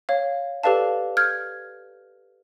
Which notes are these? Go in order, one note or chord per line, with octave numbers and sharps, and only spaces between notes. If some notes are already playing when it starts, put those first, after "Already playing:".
C#5 F5
G4 A4 B4 D5 F5 A5
F6 G6 G#6